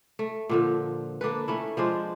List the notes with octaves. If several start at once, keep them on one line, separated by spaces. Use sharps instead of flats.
A3
A#2 D3 F3
A#3 D4 A4 B4
A3 C#4 E4
F3 G#3 D4 C5